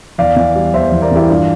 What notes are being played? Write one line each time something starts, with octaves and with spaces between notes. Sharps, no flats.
E2 D5 F5
E3
G3
E2 C5 E5
E2
A#4 D5
E3 E4 G4
G2 D4 F4